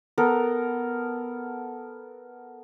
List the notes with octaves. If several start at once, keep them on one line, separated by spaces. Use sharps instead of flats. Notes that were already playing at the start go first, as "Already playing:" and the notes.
B3 A4 A#4